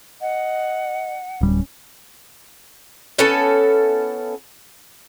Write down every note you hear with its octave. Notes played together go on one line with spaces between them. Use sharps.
D#5 F#5
D1 G3 C#4
B3 C#4 E4 A4